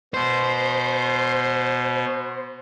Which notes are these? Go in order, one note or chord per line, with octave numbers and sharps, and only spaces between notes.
B2 C5